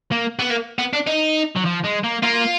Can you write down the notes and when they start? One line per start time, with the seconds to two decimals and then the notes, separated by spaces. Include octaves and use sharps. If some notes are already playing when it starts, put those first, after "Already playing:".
0.12 A#3
0.39 B3
0.50 A#3
0.79 B3
0.93 D4
1.07 D#4
1.56 F#3
1.65 F3
1.84 G#3
2.04 A#3
2.23 A#3 F4